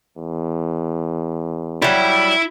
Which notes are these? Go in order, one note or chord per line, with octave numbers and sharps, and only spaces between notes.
E2
F#3 G3 E4